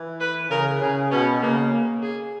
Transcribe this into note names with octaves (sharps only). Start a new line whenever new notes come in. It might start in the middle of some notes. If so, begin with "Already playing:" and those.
Already playing: E3
B4
C#3 A#4
C#3 G#4
B2 C#4
C#3 A#3
A#3
G#4